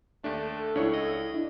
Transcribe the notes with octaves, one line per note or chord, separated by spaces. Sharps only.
D#2 A3 D4
A4
C#2 D4 E4 C#5 C#6
D#5
D4 E4